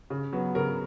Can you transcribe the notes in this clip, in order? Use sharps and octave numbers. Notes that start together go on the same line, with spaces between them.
C#3
F#3 B3
C#3 A#4